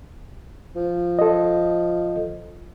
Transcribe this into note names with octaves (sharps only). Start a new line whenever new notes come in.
F3
A4 D#5